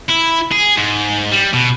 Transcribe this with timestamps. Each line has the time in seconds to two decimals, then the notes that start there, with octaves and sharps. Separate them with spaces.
0.09 E4
0.52 G#4
0.77 G#2
1.32 G3
1.53 B2